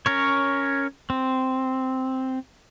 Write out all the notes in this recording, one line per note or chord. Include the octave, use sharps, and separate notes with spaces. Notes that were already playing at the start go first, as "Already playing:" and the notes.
C#4 A#4 C#5
C4